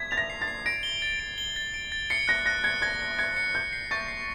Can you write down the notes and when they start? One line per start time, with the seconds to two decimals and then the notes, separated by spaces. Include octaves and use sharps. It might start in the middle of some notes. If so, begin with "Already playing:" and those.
Already playing: G#6 B6
0.11 A6 F7
0.17 A#6
0.30 C7
0.42 A6
0.48 C7
0.66 A#6 D7
0.83 G7
1.02 A6
1.20 D7
1.38 G7
1.56 A6
1.74 D7
1.92 A6
2.10 C7 C#7
2.28 F#6 A#6
2.46 F#6 A#6
2.64 G#6 C#7
2.82 G#6 A#6
3.01 A#6
3.19 G#6 C#7
3.36 C#7
3.55 F#6 G6
3.73 C7
3.91 C#6 A6
4.08 C7